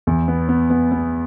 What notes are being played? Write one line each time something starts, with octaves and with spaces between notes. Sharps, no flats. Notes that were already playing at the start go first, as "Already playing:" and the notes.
E2
B3
B3
B3
B3